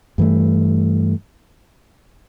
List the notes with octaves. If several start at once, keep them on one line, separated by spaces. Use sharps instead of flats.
G2 E3 A3